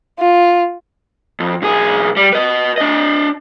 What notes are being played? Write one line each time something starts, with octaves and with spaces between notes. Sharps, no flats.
F4
F2
B1 G#4
G3
B4 D#5
D4 D#5